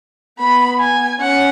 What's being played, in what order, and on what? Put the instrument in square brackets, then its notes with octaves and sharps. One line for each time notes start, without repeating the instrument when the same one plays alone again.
[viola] B3 [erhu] B5
[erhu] G#5
[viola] C#4 [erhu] F#5